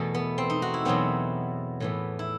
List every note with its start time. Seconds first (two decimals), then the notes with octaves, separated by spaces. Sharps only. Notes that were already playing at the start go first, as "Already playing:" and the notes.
Already playing: E2 B2 A3
0.14 B3
0.38 C4
0.50 D#4
0.62 F#4
0.74 E4
0.85 E2 B2 F#3 B3 C4
1.80 A2 E3 B3
2.19 E4